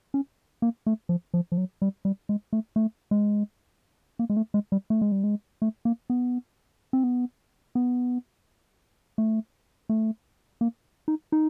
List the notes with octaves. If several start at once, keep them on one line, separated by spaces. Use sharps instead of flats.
C#4
A#3
A3
F3
F3
F3
F#3
G3
G3
G#3
A3
A3
G#3
A#3
G#3
A3
G#3
G3
A3
G#3
G3
G#3
A3
A#3
B3
C4
B3
B3
A3
A3
A#3
D#4
D#4